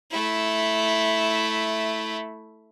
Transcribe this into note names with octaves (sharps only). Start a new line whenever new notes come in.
A3 E4